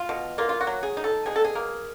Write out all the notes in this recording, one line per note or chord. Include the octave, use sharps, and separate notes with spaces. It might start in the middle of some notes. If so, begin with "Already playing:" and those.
Already playing: F4
B2
A#3 F4
F4
F#4
F#3
G#4
D#4
A4
B2 G#4
A4
G#4
A#3